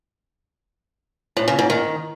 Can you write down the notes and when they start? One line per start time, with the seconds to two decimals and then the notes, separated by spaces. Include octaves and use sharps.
1.37 A2
1.48 C#3
1.59 G#2
1.70 D#3